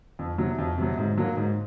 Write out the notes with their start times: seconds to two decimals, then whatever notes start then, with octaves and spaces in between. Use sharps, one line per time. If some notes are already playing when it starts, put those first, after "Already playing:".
0.19 F2
0.38 C3 F#3
0.58 F2
0.78 C3 F#3
0.97 G#2
1.18 F#3 A#3
1.37 G#2